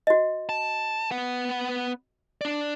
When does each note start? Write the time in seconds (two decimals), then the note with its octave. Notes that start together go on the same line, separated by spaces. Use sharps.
0.07 F#4 D#5
0.49 A5
1.11 B3 F#5
2.41 D4 D5